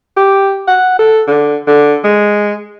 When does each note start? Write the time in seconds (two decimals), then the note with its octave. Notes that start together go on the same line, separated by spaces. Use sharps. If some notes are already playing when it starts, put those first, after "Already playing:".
0.17 G4
0.68 F#5
0.99 A4
1.27 D3
1.67 D3
2.04 G#3